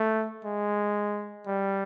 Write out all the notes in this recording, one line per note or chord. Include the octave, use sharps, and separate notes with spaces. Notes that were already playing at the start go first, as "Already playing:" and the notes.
Already playing: A3
G#3
G3